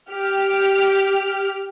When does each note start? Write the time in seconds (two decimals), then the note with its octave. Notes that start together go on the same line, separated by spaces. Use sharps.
0.11 G4 F6